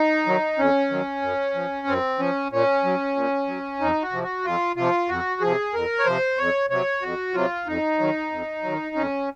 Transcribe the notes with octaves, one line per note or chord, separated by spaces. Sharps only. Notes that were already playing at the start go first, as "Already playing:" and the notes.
Already playing: D#4
D#3 F#3
F2 C#4
D#3 F#3
F#2
F3
F#2 C4
F3 C#4
A#2 C#4
F#3
A#2
F#3
F2 D#4
F#4
C3 F3
F#4
F2 F4
C3 F3 F4
F2 F#4
C3 F3 G#4
F2 A#4
C#5
C3 F3 C5
F2 C#5
C3 F#3 C#5
F2 F#4
C3 F#3 F4
F2 D#4
D#3 F#3
F2
D#3 F#3
F2 C#4